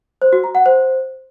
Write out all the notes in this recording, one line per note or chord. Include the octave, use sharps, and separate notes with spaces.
C5
F#4
A#5
F#5
C5